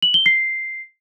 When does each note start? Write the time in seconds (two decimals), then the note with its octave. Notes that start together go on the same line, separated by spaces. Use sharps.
0.02 F#7
0.14 G7
0.26 C7